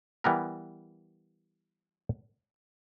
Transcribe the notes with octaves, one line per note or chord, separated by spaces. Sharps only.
E3 G3 B3 A#4